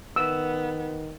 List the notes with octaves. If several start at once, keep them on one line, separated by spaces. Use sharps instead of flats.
D#3 B3 E6